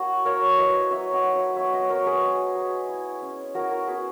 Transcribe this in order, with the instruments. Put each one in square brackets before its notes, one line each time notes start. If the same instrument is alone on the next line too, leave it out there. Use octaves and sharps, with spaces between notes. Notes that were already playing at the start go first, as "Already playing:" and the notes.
Already playing: [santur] A#3 E4 F#4 C#5
A#3 A#4 C#5
E4 B4 D#5
F#3 C#5 E5
D#5 F#5
D#4
C#5 E5
B3 C#5 E5
B4 D#5
F#3 A#4 C#5
G#4 B4
G#3
G#3
E4
C#4
E4 F#4 A#4
F#4 A#4
B3 G#4 B4